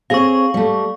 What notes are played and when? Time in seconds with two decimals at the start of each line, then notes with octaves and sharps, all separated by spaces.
0.10 C4 G#4 C#5 F5 C#6
0.54 G3 A3